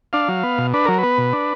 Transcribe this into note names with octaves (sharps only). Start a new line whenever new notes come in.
D4 F5
F#3
B3
B2
D4 B4
F#3 A#4
B3 B4
B2
D4